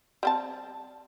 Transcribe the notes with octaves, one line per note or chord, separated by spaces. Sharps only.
G3 C4 A5